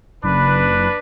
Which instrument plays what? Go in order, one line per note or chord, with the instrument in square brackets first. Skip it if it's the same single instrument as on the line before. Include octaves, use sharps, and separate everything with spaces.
[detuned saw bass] F#1 [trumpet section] D4 B4